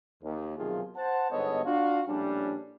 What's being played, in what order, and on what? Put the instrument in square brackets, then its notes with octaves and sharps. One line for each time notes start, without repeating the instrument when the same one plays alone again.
[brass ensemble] D#2
B1 C3 D#3 F3 F4 G#4
C5 F#5 A5
G1 G#2 B3 A4 C#5 D#5
D4 F4 F#4 F5
A#1 A2 G3 C#4 D4